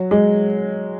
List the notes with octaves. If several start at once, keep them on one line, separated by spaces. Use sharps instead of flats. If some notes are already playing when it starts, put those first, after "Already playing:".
Already playing: F#3
G#3